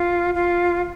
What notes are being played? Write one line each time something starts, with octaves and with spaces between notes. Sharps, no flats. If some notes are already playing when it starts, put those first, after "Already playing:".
Already playing: F4
F4